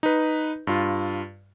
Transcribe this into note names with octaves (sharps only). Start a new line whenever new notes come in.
D#4 B4
G2 F4